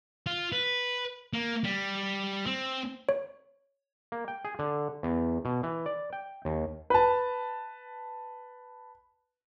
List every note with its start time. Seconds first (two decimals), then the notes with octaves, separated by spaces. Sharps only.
0.26 F4
0.52 B4
1.33 A#3
1.64 G3
2.46 C4
3.09 C#5
4.12 A#3
4.28 G5
4.45 G#4
4.59 D3
5.03 E2
5.45 B2
5.63 E3
5.86 D5
6.13 G5
6.45 D#2
6.90 B4 A5